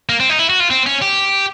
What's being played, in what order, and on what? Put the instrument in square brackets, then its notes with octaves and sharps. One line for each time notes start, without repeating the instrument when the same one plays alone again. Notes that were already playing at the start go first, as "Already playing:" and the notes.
[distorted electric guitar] A#3
C4
D#4
E4
F#4
F4
C4
C#4
G4